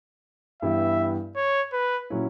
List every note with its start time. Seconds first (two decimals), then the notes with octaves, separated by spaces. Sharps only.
0.62 G2 E3 B3 E4 G4 E5
1.36 C#5
1.73 B4
2.10 A#2 F#3 C#4 E4